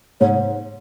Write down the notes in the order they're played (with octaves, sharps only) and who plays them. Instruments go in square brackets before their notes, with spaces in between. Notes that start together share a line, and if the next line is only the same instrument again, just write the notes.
[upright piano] G#2 [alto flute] C#5